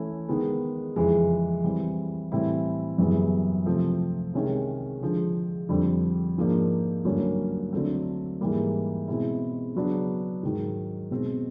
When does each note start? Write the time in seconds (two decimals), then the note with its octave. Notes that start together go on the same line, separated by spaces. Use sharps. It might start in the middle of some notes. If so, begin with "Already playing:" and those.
Already playing: E3 A3 C#4 E4
0.29 D#3 G#3 B3
0.96 F2 C#3 E3 G#3
1.64 E3 G3 C4
2.32 A2 E3 G3 C4 E4
2.98 F#2 C#3 E3 G3 B3
3.66 C3 F3 A3 C4
4.34 C3 D#3 G#3 C#4
5.02 D3 F3 G#3
5.69 F2 D3 G3 C4
6.38 G#2 F3 A#3 D4
7.05 G2 D3 F#3 A#3 C#4
7.73 D3 F#3 A3 C4
8.41 G#2 E3 G3 A#3
9.08 B2 G#3 C4 E4
9.75 C#3 F#3 B3 D4
10.43 G#2 D#3 F#3
11.11 B2 G#3 C4